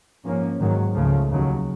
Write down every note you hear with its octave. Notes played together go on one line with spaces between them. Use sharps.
G#2 F3 A#3 C#4
G#2 D#3 F#3
C#2 C#3 F3 A3
D#2 C#3 F#3